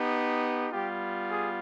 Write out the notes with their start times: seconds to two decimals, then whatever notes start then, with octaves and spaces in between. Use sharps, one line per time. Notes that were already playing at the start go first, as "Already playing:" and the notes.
Already playing: B3 D#4 G4
0.71 G3 B3 F4 G4
1.30 G#4